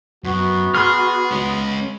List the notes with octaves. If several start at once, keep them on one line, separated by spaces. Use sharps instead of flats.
F#2 B3 F#4
G#4 B5 C6 F6
G#3 C#4